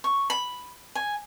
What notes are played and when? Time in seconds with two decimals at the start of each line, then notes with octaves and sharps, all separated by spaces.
0.04 C#6
0.30 B5
0.95 G#5